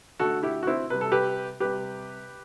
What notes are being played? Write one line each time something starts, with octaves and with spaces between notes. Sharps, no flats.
D3 A3 F#4 A4
E4 G4
F#4
C4 E4
C3 G3 B4
A4
G4 B4
C3 G3 G4 B4